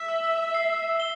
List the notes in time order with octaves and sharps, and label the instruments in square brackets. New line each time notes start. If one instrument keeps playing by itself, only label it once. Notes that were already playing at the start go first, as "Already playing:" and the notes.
Already playing: [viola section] E5 [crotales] E7
[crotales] E6
C7
G7